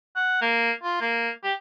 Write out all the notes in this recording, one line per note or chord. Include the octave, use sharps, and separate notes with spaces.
F#5
A#3
F4
A#3
G4